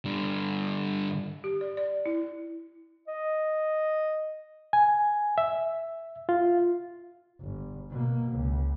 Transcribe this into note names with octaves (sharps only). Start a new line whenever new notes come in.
G2 D3
G4
D5
D5
E4
D#5
G#5
E5
F4
G1
B2 A#3
C#2